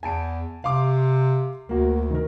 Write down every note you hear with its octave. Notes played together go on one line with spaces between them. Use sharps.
E2 G#5 A5 D7
C3 F5 C6 D6
D2 A#3 F#4
D#3 A#4